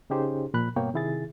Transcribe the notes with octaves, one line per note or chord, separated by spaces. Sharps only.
C#3 C#4 D#4 G4 G#4 C5
A#2 F3 B5 F#6
G2 B2 A#3 B3 C#5 G5
C3 D#3 E4 G#4 A6